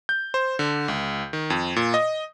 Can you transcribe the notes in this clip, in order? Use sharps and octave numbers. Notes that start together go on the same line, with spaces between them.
G6
C5
D3
C#2
D#3
F2
A#2
D#5